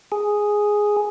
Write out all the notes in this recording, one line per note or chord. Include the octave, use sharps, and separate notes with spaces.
G#4